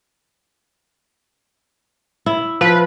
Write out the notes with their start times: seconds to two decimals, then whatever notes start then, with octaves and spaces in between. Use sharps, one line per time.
2.26 E4
2.61 F3 B4